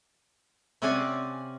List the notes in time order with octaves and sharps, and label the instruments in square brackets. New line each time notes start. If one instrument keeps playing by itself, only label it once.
[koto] C3 C4 C#4 D5 F#5 G#5